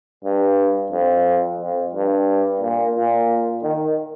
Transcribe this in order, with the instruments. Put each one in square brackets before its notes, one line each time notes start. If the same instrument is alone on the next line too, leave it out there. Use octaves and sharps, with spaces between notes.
[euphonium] G2
F2
F2
G2
A#2
A#2
D#3